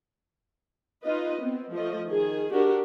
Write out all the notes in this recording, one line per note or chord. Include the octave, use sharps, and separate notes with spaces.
D#4 F4 B4 D#5
B3 C4
F3 A3 D#5
D#3 G#4
D4 F#4 G4 A#4